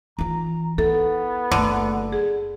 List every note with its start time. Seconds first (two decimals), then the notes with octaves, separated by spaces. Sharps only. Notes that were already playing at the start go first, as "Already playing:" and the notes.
0.19 E3 F4 A#5
0.78 B3 E4 A4
1.51 F#1 D3 A3
2.13 G#4